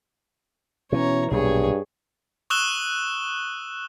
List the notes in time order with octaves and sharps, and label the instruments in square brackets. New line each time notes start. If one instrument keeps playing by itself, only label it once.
[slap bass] B2 E3 [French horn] C#4 [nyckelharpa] C#5 A#5
[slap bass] B1 A#2 [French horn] G2 [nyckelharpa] G#4 C#5
[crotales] C#6 D#6 E6 F#6 E7 G7